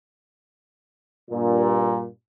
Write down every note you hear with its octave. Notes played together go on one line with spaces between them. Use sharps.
G2 A#2